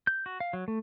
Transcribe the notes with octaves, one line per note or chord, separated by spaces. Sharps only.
G6
F#4
F5
F#3
A3